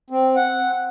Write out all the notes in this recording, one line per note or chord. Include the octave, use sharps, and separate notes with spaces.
C4
F#5